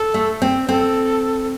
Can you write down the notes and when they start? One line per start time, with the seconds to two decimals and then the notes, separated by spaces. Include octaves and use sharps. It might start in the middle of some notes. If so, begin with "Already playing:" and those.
Already playing: A4
0.14 A3
0.42 C4
0.69 C4 A4